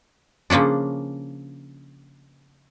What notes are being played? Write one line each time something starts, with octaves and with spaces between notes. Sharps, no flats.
C#3 F3 A#3 C#4 D4